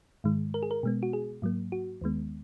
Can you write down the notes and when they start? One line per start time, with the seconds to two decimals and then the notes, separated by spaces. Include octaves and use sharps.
0.24 G#2 D#3 G#3
0.54 A#4
0.63 G#4
0.71 A#4
0.83 B2 G#3 B3
1.03 F#4
1.13 G#4
1.42 G#2 F#3 A#3
1.72 F#4
2.01 D#2 D#3 G#3 B3